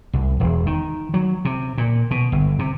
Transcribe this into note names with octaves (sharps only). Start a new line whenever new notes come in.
C2
E1
D#3
F#3
C3
A#2
B2
G1
C3